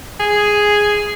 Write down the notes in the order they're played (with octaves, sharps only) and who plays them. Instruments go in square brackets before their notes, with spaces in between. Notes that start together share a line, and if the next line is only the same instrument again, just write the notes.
[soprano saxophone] G#4